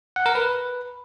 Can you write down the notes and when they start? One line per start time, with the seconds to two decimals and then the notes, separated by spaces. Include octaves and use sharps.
0.16 F#5
0.26 A#4
0.35 B4